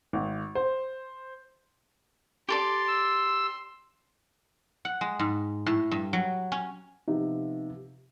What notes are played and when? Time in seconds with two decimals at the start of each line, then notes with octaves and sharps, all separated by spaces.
0.13 G#1
0.55 C5
2.48 G4 A4 D5 C6
2.87 E6
4.85 F#5
5.01 G#3
5.19 G#2
5.66 A2
5.91 G2
6.13 F#3
6.52 C#4
7.08 C3 F3 B3 D#4